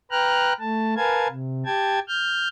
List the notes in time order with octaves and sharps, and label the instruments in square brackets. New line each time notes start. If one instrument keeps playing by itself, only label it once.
[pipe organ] B4 G5 A#5 F6 F#6
A3 A5
A#4 B4 F5 G#5 A5 G#6
C3
G4 G5 A5 G#6
F6 G6